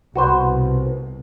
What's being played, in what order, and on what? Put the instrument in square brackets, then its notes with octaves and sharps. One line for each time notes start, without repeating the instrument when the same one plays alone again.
[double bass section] C2 B2 [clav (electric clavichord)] F#4 B4 C5